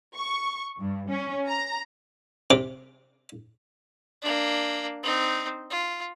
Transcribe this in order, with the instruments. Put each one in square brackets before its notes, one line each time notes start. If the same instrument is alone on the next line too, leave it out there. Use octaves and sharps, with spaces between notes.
[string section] C#6
G2
C#4
A#5
[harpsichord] C3 D6
[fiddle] A#3 D4
C4 D#4
F4